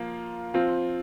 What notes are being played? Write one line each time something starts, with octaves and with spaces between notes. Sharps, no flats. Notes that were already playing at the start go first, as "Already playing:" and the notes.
Already playing: F3 A#3 F4
F3 C4 F4